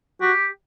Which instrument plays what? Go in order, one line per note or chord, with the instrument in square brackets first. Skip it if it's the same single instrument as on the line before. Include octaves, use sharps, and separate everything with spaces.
[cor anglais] F#4 [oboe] G4